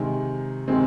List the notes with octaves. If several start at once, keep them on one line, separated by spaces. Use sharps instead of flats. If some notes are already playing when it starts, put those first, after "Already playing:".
Already playing: C3 D#3 G#3
C3 D#3 G#3 C4